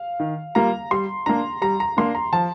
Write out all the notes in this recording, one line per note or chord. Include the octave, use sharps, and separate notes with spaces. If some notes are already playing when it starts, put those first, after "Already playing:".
Already playing: F5
D#3
G3 A#3 F4 A#5
G3 C6
A#3 D4 A#5
G3 A#5
A#5
A#3 D4 C6
A#5
F3 A5